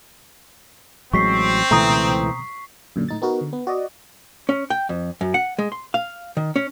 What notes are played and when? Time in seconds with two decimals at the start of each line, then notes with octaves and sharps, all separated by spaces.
1.13 A1 F#3 G#3 C4 C#6 B6 C7
1.71 C#2 B2 E3 A3 A#5 D#6
2.96 F#2 A#2 D3
3.08 A2 D#4 A6
3.22 B3 D#4 F#4 A#4
3.41 D3
3.53 B3
3.67 F#4 D5 D#5
4.49 C#4
4.70 G5
4.89 F2
5.21 F#2
5.34 F#5
5.59 G#3
5.72 C6
5.94 F5
6.37 D#3
6.56 C#4